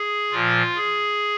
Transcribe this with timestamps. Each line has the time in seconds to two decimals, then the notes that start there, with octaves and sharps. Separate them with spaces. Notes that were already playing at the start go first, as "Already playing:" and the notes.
Already playing: G#4
0.32 A#2 F3 F4
0.76 G#4